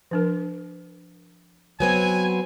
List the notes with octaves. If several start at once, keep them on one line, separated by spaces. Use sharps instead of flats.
F3 D4 A#4
F#3 B3 C4 G#5